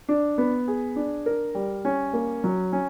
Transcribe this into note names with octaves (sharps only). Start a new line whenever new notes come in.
D4
B3
G#4
D4
A#4
G3
C#4
A#3
F#3
C#4